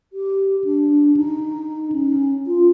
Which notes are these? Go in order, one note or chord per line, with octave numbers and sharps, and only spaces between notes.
G4
D4
D#4
C#4
F4